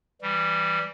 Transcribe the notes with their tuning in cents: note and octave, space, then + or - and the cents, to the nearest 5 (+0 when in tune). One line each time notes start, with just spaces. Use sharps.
E3 +0 G3 +0